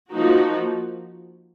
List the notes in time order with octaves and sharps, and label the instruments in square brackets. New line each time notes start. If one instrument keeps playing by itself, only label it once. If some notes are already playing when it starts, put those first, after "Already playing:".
[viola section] F3 A#3 D#4 F#4